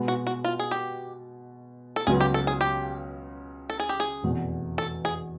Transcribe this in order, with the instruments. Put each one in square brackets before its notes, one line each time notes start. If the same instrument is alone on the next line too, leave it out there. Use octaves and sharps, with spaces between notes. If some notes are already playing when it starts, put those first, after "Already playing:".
Already playing: [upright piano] B2 G#3 B3
[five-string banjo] F#4
F#4
F4
G#4
G4
A4
[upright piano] C#2 C#3 F#3 B3 [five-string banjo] G#4
[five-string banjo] G4
A4
G#4
G4
A4
G#4
G4
G#4
[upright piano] F1 E2 B2
[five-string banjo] A4
G#4